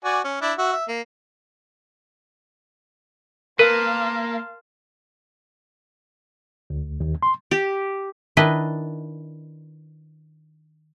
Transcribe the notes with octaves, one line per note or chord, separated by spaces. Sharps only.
F#4 D5 G#5
C#4
D4 E4
F#4 E5
E5
A#3
A#3 A#4 B4 F5 A5 C6
D2
D#2
C6
G4
D#3 D4 E4 B4 D#5